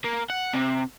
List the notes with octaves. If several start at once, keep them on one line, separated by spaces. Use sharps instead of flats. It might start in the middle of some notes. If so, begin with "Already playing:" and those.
A#3
F#5
C3